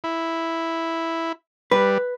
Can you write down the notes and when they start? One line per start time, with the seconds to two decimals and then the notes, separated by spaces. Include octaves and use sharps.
0.04 E4
1.71 G3 B4